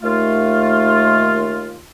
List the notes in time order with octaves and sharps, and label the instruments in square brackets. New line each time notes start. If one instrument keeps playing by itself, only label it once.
[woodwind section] D#2 A3 F4